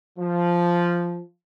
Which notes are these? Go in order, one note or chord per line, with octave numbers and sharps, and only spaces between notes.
F3